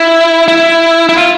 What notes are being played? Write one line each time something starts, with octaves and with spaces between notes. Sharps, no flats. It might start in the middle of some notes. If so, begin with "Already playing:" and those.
Already playing: E4
E4
E4
F4